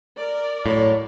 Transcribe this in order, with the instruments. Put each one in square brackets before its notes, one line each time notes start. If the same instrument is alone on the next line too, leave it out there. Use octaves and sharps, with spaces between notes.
[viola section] A#4 D5
[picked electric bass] A2 [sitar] F#3 C5 C#5